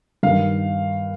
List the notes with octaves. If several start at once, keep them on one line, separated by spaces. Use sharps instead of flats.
G2 D#3 F5